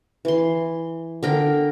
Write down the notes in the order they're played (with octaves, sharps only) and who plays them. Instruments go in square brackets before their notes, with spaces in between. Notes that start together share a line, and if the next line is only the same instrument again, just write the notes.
[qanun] E3 C6
D3 A#4 G5